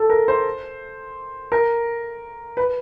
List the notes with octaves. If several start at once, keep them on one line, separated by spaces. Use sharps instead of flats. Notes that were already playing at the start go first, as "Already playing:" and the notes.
Already playing: A4
A#4
C5
A#4
B4